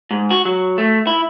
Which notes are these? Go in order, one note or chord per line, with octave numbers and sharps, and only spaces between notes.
G#2
F#4
F#3
A3
E4